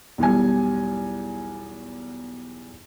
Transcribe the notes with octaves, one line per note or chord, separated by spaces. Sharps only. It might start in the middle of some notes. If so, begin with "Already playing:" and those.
B1 E2 G3 G#5